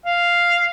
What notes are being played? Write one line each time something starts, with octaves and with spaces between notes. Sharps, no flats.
F5